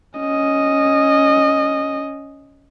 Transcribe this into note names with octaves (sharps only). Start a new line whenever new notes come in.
C#4 D#5